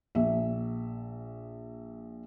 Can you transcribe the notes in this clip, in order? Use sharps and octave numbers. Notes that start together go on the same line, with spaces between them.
A#1 E5